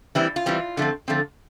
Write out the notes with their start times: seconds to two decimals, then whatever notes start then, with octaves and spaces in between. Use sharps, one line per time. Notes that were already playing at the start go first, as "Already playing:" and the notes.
0.15 E3 G3 C4 E4
0.36 F4
0.46 E3 G3 C4
0.77 D3 F3 A3 C4
1.08 D3 F3 A3 C4